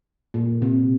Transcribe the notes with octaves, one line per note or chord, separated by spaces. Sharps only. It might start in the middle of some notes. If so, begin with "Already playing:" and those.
A#2
C3